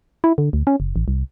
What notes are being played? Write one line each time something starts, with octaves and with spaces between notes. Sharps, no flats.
E4
D3
D2
C#4
F#1
A1
C2